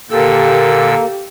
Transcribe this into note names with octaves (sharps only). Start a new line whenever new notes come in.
A#2 D3 A#3 G4 A4 E6